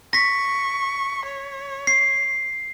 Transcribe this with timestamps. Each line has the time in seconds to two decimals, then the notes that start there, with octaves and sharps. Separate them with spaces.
0.13 C#6 A#6 B6
1.25 C#5
1.87 C7